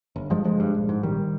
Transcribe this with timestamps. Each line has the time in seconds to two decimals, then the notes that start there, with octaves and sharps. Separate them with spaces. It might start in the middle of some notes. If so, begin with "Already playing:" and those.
0.16 G1
0.30 G2 F3 G#3
0.44 G1 F3 G#3
0.60 G2
0.74 A#1
0.89 G#2
1.03 A#1 D#3 G3